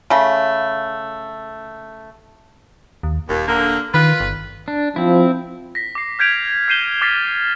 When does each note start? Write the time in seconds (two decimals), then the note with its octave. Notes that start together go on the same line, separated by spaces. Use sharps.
0.10 C#3 A3
3.03 D#2
3.29 D#1 D#2
3.48 D3 A#3
3.94 D#3 F4 B4
4.20 G1
4.68 D4
4.96 F3 C4 E4
5.75 A#6 B6
5.95 D6 C7
6.19 F6 G6 G#6 B6 D7 F7
6.68 F6 G6 C7 D#7 E7 G7
7.01 D6 F6 A6 B6 C7